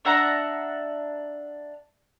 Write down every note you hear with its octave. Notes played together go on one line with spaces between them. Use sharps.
D4 E5 F#5 A#5